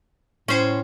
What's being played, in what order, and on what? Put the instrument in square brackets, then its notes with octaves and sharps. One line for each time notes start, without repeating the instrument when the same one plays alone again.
[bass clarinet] A2 [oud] C#4 C5